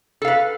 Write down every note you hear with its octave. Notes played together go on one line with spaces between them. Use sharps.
A4 B4 F5